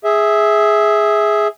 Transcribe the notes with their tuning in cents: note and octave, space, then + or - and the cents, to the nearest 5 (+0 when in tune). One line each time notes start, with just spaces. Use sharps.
G#4 +0 E5 -10